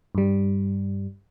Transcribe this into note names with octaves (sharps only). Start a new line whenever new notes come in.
G2 G3